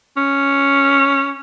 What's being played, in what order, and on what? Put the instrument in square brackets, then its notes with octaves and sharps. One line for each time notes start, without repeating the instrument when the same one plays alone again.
[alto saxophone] C#4